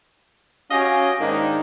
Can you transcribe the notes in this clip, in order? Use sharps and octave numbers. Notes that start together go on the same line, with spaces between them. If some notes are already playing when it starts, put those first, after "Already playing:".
C#4 F#4 G4 D#5 F5 G#5
G#2 D#3 A#3 D4 D#4